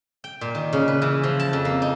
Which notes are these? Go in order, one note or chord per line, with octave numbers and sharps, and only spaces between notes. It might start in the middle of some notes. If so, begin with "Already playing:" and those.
G5
A#2
D#3
C#3
B4
E3
F3
A5
F2
A#3
D#4